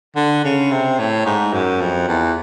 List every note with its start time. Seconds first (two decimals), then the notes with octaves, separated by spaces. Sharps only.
0.16 D3
0.45 C#3
0.72 C3
0.99 A2
1.26 G#2
1.53 F#2
1.81 F2
2.08 E2